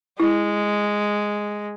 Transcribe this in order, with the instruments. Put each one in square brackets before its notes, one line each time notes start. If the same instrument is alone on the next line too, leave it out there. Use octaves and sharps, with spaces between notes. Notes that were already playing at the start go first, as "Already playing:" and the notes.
[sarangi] G#3 [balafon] E4